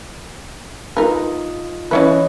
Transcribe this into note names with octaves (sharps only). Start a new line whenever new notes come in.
D#4 F4 A#4 B4
E3 C#4 E4 B4 C#5 D#5